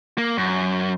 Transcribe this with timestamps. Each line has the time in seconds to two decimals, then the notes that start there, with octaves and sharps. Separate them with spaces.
0.18 A#3
0.38 F#2